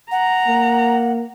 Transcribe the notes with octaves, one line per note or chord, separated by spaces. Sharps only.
F#5 A#5
A#3